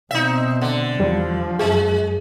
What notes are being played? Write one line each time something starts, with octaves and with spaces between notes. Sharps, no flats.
B2 C4 D#4 E5
D3
E2 F3 G3
F#2 G#3 G#4